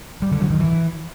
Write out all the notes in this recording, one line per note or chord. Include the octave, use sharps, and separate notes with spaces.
G3
D3
F#3
D#3
E3